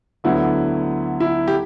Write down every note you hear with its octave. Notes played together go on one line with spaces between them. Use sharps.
D2 D3 F#3 B3 E4
E4
G4